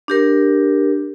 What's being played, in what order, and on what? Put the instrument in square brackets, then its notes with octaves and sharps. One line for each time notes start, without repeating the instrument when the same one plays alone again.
[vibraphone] D4 G4 A#4